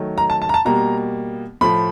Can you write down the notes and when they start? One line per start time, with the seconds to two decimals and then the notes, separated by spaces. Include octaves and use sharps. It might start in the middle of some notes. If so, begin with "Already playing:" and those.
Already playing: D#3 F#3 A3
0.18 A#5
0.30 A5
0.42 A5
0.49 A#5
0.54 A5
0.65 B2 G3 A#3 A#5
1.61 A2 F3 A3 B5